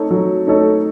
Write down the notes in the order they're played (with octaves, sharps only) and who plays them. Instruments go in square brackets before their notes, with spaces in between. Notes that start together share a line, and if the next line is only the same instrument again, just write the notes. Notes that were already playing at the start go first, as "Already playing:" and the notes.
Already playing: [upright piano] A3 D#4 A4 C#5
F#3
A3 D#4 A4 C#5